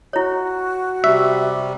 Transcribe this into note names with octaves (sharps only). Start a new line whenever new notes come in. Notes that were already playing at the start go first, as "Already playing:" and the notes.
E4 F#4 C#5
C3 G3 E5